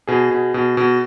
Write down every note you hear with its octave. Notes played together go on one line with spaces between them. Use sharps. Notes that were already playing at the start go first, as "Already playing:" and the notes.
B2 G#4
B2
B2
B2